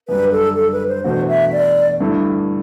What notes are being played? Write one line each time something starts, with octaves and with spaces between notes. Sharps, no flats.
F#2 D3 G3 B4
A4
A4
B4
C5
E2 B2 A3 D4 F#4 C5
E5
D5
G2 D3 A3 E4